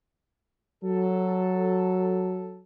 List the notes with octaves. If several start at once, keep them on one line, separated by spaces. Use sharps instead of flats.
F#3 A4